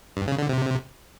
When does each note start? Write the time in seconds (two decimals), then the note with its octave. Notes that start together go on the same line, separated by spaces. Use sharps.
0.17 G2
0.27 C#3
0.38 D3
0.49 C3